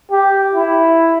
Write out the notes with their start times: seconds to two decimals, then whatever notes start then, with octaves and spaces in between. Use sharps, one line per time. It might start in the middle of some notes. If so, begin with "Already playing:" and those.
0.11 G4
0.55 E4